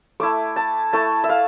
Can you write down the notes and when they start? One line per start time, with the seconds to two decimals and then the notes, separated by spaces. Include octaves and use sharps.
0.20 A3 E4 D6
0.56 A5
0.93 A3 E4 A5
1.24 E5
1.29 F5